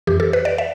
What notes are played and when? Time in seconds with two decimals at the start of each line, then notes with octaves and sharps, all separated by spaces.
0.07 F2 E3 G4
0.20 A4
0.33 B4
0.45 D5
0.58 E5